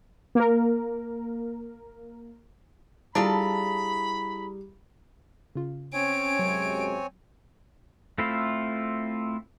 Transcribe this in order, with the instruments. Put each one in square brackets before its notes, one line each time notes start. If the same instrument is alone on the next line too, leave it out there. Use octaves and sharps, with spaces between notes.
[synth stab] A#3 A#4
[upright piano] G3 [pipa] D4 F4 A4 [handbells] E4 G#4 A#5 [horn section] B5
[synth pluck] C#3 F4
[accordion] C4 C#5 G#5 [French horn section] C#4 [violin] D7
[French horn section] F#2 C3 G#3 [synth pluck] F#3
[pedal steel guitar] A3 C4 E4 F4 A4